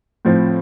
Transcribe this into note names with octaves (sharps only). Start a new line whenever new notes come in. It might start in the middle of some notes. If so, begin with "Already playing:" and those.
A2 F3 C4